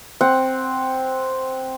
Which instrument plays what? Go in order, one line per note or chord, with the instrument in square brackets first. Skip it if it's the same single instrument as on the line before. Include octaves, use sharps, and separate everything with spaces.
[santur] C4 F#5